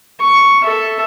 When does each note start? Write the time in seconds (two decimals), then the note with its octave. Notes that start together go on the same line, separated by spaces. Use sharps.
0.20 C#6
0.65 A4 E5